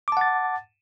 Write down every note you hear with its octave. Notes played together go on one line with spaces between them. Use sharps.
F#5 A5 D6 A6